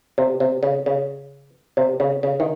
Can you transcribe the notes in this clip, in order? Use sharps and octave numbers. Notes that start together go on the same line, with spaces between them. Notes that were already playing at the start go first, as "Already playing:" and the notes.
C3
C3
C#3
C#3
C3
C#3
C#3
D#3